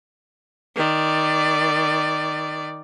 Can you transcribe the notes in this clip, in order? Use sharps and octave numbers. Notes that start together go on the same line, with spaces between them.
D#3 D5